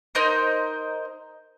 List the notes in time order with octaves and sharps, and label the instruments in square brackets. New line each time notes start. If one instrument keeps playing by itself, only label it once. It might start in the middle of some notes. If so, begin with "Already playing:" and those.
[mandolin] D#4 A#4 C5